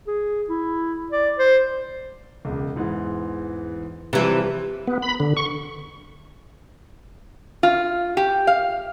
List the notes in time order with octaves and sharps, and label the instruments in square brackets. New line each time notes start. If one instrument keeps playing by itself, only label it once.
[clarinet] G#4
E4
D5
C5
[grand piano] E1 C#2
E2 G#2 E3
[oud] C3 E3 [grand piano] F3 G3 B4
[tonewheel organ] B3
B5
D3
C#6
[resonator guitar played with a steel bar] F4
G4
F5